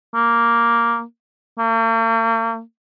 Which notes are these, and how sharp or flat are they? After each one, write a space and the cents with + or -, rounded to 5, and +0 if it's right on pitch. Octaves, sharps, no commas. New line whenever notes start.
A#3 +0
A#3 -45